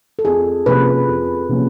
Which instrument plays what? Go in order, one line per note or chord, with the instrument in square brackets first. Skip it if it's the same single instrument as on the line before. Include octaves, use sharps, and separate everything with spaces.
[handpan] A4
[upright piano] F2 [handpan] G#4
[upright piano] C3 F3 A#3 C#4 [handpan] B4
[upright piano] F2
C3 F3 A#3 C#4